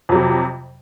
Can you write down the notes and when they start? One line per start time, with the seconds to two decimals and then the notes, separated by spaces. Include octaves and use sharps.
0.09 F2
0.12 F#3
0.15 C3